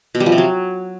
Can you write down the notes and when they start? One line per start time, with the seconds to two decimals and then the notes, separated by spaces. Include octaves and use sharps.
0.15 B2
0.20 G3
0.26 F3
0.32 C3
0.38 F#3